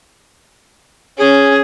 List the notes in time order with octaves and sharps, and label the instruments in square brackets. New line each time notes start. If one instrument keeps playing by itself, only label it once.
[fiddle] C#4 [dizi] G#4